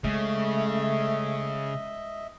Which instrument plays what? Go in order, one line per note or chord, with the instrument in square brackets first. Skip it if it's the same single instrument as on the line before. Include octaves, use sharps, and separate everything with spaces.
[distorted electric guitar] C#3 [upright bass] G#3 [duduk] A3 [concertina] D#5 E5